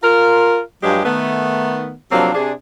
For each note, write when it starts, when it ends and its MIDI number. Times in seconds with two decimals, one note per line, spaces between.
0.03 0.59 65
0.03 0.59 70
0.83 1.02 43
0.83 1.02 53
0.83 1.02 54
0.83 1.02 56
0.83 1.02 67
0.83 1.02 68
1.05 1.94 51
1.05 1.94 57
1.05 1.94 59
2.12 2.32 48
2.12 2.32 53
2.12 2.32 54
2.12 2.32 58
2.12 2.32 60
2.12 2.32 62
2.35 2.51 48
2.35 2.51 62
2.35 2.51 68